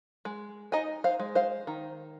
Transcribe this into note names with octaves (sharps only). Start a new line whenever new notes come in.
G#3
D#4 D#5 G#5
C5 F5
G#3
C5 F5
D#3